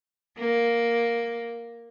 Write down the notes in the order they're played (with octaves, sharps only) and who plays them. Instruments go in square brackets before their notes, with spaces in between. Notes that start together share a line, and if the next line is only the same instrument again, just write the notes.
[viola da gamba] A#3